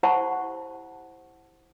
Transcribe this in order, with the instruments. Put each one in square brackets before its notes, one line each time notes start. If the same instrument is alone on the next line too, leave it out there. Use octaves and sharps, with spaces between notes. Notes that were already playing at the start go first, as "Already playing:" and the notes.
[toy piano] E4 G4 C5 F#5 A5 C#6